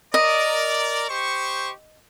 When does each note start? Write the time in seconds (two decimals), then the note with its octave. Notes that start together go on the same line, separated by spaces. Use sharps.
0.14 A#4 D5 D#5
1.10 G4 C5 C#6